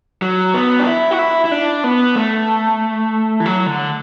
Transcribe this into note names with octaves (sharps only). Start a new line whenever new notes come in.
F#3
B3
D4
E4
F#4
E4
E4
D4
B3
A3
E3
F#3
D3